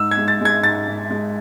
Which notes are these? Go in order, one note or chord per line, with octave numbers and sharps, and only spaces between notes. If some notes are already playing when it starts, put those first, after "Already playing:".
Already playing: G#2 E6
G#6
G#3
A6
G#3 G#6
G#2 A6
G#2
G#3